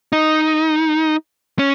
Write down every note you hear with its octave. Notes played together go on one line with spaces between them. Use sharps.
D#4
C#4